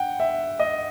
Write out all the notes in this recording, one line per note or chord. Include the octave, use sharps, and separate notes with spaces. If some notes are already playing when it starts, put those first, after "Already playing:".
Already playing: F#5 G5
E5
D#5